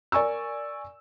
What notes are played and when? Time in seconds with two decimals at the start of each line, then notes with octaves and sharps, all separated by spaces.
0.12 A#4 D5 G#5 C#6 E6